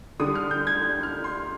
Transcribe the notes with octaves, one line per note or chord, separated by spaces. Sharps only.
D3 G3 D#6
F6
G6
G#6
G6
F6
C6